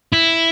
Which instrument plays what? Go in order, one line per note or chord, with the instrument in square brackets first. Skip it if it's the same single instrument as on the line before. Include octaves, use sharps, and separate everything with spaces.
[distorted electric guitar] E4